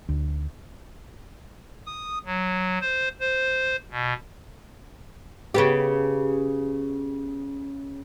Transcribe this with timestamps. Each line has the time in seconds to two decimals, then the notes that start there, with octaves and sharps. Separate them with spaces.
0.09 D2
1.87 D#6
2.26 F#3
2.81 C5
3.20 C5
3.91 B2
5.54 C#3 B3 G4